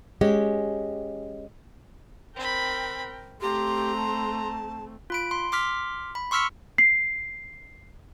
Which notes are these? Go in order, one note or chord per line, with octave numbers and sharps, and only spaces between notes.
G#3 C#4 G4
C4 A#4 G5 B5
A3 C4 G4 A#5 C6
A5
F4 B5 D7
C6
C6 D6 F6 B6
B5
C6 C#6 E6 F6 B6 C#7
C7